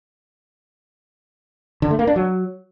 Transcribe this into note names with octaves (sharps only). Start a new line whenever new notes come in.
D3
A3
A#3
D4
F#3